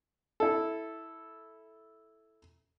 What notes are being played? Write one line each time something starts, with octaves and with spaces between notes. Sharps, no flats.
E4 A4